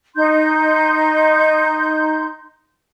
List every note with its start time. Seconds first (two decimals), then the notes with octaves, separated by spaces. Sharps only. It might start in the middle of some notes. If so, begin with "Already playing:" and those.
0.16 D#4 C6 G6